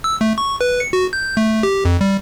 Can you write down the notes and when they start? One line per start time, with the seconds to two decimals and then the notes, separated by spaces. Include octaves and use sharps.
0.04 E6
0.21 A3
0.38 C#6
0.61 B4
0.80 C#7
0.93 F#4
1.13 G6
1.37 A3
1.63 G4
1.85 F2
2.01 G3